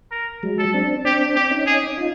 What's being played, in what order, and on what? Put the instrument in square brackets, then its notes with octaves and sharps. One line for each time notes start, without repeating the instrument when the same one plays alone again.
[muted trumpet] A#4
[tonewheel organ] F#3 G#3
[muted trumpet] A4
[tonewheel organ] C4 D4
[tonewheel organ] C4 D4 [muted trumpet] G4
[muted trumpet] G4
[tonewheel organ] C#4 D#4
[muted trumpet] G#4
[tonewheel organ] D#4 F4